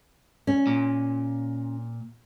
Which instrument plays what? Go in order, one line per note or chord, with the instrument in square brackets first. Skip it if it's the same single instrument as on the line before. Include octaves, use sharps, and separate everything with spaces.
[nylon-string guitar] C#4
[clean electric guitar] A#2